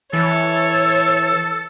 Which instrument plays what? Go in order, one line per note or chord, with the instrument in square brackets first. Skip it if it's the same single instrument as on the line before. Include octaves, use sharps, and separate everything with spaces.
[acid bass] E3 [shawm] A4 [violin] C#5